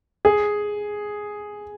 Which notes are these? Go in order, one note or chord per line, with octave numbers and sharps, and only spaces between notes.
G#4